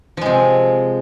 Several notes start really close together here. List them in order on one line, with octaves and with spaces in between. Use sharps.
F3 G#3 C3